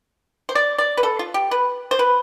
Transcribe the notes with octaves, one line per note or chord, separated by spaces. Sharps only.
C5
D5
D5
B4
A4
F4
G4
B4
C5
B4